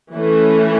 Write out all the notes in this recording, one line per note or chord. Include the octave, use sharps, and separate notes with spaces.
E3 A3 C#4